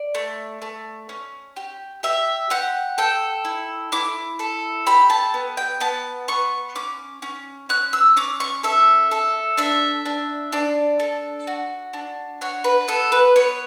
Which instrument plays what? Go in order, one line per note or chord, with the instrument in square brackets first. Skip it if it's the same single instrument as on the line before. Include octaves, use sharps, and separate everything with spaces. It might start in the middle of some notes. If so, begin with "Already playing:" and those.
Already playing: [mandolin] D5
A3
A3
C#4
G4
G4 E5
G4 F#5
A4 G5
E4
E4 D6
A4
G4 B5
A5
B3
G5
B3 A5
B3 C#6
C#4 D6
C#4
C#4 F#6
E6
C#4 D6
C#6
A4 E5
A4
D4 E5
D4
D4 D5
A4
F#4
D4
F#4 C#5
B4
B3 A4
B4
B3 C#5